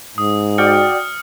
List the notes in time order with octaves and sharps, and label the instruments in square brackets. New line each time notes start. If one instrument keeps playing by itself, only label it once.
[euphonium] G#2 [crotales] D#6
[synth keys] F#4 D5 G5 [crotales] F6 C#7